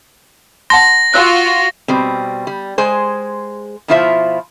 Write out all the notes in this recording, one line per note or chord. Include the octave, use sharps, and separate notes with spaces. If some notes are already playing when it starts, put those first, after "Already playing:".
F#5 A5 C6 A#6
F4 F#4 E6 F#6
B2 G3 C4
G3
G#3 G#4 C5
B2 F3 E4 F4 C5 E5